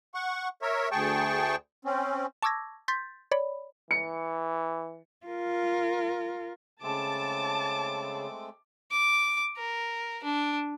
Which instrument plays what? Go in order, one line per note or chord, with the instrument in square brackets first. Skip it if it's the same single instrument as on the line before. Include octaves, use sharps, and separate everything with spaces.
[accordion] F#5 C#6
A#4 C#5 E5
D2 G#4 G5 A5 C#6
C4 C#4
[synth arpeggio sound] A5 C#6 D6 E6 G#6 A#6
C6 G6 A6 B6
C#5 D5 B5
[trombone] E3 [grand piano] C#7
[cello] F4 A#4
[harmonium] C#3 [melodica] G#3 A3 C4 [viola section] A5 [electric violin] D6
[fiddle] D6
A#4
D4